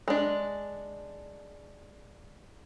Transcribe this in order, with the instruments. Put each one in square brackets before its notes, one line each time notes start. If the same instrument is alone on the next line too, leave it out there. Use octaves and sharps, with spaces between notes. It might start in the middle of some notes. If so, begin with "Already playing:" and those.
[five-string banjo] G#3 D4